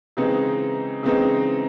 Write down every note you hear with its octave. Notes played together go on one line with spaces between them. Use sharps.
C#3 E3 G#3 C4 D#4
C#3 E3 G#3 C4 D#4